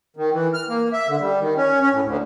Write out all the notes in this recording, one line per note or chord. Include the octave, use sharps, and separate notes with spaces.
D#3
E3
F6
A#3
E5
D3
G3
D#3
C#4
C#4
A2
D2